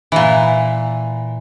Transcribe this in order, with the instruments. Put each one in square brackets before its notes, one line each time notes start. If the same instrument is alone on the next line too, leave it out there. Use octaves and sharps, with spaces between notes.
[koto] A#2 E3